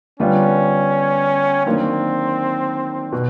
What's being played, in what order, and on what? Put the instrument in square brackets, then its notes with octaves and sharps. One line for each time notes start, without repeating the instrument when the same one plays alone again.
[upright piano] D3 G3 B3 D4 F4 [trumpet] C#4
[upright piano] D#3 F#3 A#3 D4 [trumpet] C4
[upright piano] B2